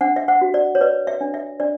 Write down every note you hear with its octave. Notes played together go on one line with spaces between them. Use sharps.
D4 F#5
E5
F#5
F#4
D5
C#5
B4 D5
E5
D4
E5
D4 D5